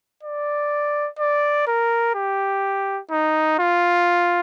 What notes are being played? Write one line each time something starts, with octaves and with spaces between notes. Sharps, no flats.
D5
D5
A#4
G4
D#4
F4